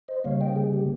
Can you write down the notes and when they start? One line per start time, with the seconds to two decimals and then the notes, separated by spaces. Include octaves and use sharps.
0.08 C5 D#5
0.24 C#3 G3 A#3 C#5 F5
0.41 D#5 G5
0.56 G#4
0.73 G4